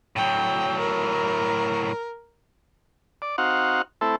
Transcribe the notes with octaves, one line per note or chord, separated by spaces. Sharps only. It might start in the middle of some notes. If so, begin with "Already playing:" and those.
A2 F#3 G5
A#4
D5
C4 D#4 F#4 F5 F#5
A3 C4 E4 A4